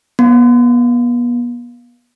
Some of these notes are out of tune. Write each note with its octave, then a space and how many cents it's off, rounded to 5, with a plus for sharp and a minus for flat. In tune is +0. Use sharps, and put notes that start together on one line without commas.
B3 -35